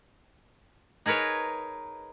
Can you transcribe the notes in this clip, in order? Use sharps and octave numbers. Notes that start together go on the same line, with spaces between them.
D#4 G#4 A#4 B4 C#5